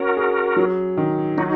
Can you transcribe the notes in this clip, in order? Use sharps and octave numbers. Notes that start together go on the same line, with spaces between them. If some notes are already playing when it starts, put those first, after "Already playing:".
Already playing: C#4 F#4 A#4
G#4
F#3
D#3
F#3 D#4 F#4